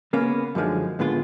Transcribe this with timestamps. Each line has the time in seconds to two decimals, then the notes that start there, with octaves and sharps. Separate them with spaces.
0.13 C#3 A#3 B3 C#4
0.55 F#2 D3 D#3 F3 G#3
0.99 A2 D3 G#3 B3 F4